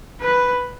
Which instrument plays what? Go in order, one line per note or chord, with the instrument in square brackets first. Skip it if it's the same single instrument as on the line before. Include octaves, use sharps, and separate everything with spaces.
[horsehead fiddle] B4